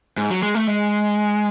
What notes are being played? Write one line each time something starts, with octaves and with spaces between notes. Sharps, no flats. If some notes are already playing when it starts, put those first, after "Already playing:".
G#2
F#3
G#3
A3
G#3